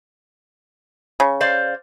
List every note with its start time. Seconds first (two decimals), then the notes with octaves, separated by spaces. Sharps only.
1.20 C#3
1.41 C5 D5 F5